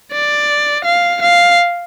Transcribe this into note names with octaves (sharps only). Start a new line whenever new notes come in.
D5
F5
F5